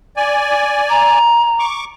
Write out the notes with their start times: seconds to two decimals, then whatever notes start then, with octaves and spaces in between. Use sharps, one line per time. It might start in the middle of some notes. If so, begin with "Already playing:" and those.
0.17 D5 G#5
0.89 A#5
1.59 C#6 D6